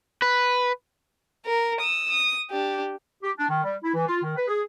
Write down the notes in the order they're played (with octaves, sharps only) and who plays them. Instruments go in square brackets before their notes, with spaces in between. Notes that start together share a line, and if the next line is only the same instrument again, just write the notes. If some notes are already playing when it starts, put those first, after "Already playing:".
[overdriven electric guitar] B4
[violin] A#4
D#6 E6
D#6
D4 G4
[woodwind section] G4
D4
D#3
G3
E4
E3
F4
D#3
B4
G#4